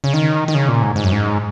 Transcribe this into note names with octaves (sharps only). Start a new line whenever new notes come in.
C#3
D#3
D#3
C#3
A#2
G#2
G#2
F#2
G#2